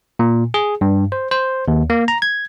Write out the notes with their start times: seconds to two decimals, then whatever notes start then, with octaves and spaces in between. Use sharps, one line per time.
0.19 A#2
0.54 G#4
0.81 G2
1.12 C5
1.31 C5
1.68 D#2
1.90 A#3
2.08 A#5
2.22 G#6